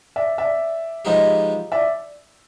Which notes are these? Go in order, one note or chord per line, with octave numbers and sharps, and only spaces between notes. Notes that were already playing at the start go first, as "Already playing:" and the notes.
D5 E5
D5 E5
F3 G#3 B3 D#4 G4
D5 E5